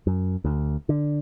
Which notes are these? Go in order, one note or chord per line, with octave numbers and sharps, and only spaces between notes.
F#2
D2
D3